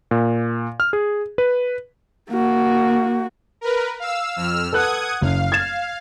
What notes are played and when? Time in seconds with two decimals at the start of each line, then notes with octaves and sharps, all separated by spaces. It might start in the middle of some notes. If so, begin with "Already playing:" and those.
0.11 A#2
0.80 F6
0.93 G#4
1.38 B4
2.29 A#3 F#4
3.61 A#4 B4
4.00 F5 E6
4.36 F2 E6 F6
4.73 A4 B4 F#5 D#6 F#6 G#6
5.21 F#1 F5
5.52 G#6 A6 E7